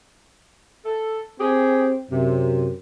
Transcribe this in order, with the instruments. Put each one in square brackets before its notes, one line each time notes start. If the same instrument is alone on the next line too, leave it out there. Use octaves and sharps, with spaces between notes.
[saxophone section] A4
[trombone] C4 [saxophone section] G4 G#4
[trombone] F#2 [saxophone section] C3